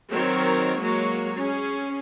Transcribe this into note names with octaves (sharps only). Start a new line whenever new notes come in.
D#3 F#3 C4 A#4 C#5
F#3 G#3 A#3 F#4 C#5
C#4 G#4